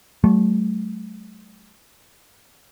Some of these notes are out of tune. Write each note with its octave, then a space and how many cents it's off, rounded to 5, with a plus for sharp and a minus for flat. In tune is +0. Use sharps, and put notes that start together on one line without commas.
F#3 +35 A3 -20